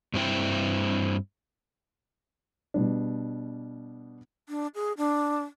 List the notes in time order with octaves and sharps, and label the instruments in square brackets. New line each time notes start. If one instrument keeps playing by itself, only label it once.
[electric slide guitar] G2 C4 E4 G5
[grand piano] B2 G3 D4
[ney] D4
G#4
D4